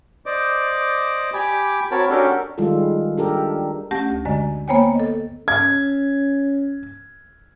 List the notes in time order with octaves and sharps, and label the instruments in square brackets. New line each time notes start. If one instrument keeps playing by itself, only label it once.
[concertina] C5 D5 D#5 D6
G4 G#5 B5 D6
C4 F#4 A#4 C#5 A5 B5
C#4 D4 F#4 G4 A4 A#4
[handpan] D#3 G3 G#3 F4 A4
D4 G4 A4 A#4
[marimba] A3 C#4 G4 F#5 A5 A#6
D2
F#2 D3 G#3 D5 D#5
A#3 B3 C5 C#5 G5 G#5
A4 D#5
[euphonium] C#4 [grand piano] G#6